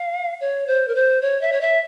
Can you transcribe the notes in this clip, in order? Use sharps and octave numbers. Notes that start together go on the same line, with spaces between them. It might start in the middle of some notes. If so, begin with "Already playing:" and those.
Already playing: F5
C#5
C5
A#4
C5
C#5
E5
C#5
E5